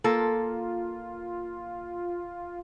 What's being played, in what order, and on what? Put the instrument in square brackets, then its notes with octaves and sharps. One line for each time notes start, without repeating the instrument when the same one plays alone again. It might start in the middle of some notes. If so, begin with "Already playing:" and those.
[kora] A#3 A4 [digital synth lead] F4